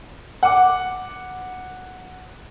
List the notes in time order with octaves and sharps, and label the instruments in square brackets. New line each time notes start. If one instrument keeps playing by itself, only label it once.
[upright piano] F#5 D6